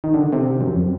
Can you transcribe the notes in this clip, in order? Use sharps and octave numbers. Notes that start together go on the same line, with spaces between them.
D#3
D3
C3
F#2
F2